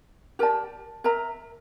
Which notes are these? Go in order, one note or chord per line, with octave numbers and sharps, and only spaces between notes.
G4 A#4 D5 A5
A#4 E5 A#5